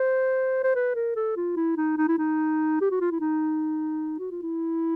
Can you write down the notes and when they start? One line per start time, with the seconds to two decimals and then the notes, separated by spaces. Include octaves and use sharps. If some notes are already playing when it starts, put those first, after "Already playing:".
Already playing: C5
0.64 C5
0.75 B4
0.95 A#4
1.16 A4
1.36 F4
1.56 E4
1.77 D#4
1.98 D#4
2.08 E4
2.18 D#4
2.81 G4
2.91 F#4
3.01 F4
3.11 E4
3.20 D#4
4.19 F#4
4.31 F4
4.43 E4